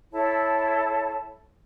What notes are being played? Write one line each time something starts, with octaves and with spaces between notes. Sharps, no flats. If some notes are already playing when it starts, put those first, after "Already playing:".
E4 A4 C#5 A5